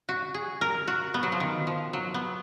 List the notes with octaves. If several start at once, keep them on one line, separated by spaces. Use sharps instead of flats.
F#4
G#4
A#4
F#4
B3
F#3
F3
D#3
F3
F#3
B3